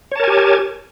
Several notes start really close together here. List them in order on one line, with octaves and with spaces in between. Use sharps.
C#5 A5 A#4 G#5 G4